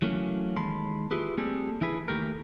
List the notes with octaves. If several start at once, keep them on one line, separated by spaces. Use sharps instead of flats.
E3 F#3 A3 A#3 C#4
D#2 G#3 A5 B5 C6
E4 F4 G4 G#4 B4
G3 A3 A#3 C4 G#4 A4
E3 E4 G#4 B4
D#2 A3 G4 A#4